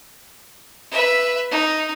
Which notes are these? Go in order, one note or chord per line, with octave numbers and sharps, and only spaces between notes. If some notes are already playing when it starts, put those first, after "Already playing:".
B4 E5
D#4